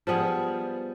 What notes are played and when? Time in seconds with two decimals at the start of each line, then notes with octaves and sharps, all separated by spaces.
0.07 F3 G3 B3 G#4